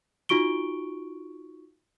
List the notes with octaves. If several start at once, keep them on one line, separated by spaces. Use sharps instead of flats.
D#4 F4 F#4 C#6 D7 G7